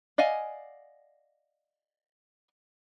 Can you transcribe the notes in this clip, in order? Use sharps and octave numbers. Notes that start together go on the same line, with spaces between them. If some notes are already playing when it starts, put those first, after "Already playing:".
D5 D#5 F5 F#5 G#5